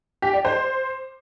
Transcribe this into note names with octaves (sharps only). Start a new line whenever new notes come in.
G4
D5
C5